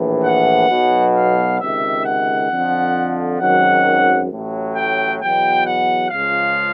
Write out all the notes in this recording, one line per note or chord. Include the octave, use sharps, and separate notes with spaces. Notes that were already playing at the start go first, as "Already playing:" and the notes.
Already playing: A#1 A2 E3
F#5
B1 B2 F#3
F5
C#2 C3 D#3 E5
F#5
F2 D3 F3
G#1 F#2 D#3 F#3 F#5
A1 A2 F#3
G5
E2 B2 F#3 G5
F#5
C#2 C#3 F3 F5